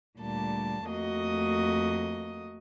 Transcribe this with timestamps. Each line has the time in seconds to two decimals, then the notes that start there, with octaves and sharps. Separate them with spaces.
0.19 D2 A#2 G3 A5
0.87 F2 A3 A#3 F#4 D#5 D#6